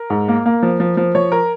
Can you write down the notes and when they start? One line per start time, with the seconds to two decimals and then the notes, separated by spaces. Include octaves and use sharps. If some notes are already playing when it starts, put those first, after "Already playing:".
Already playing: A#4
0.10 G#2
0.28 A#3
0.46 A#3
0.63 F3
0.80 F3
0.97 F3
1.15 F3 C#5
1.32 A#4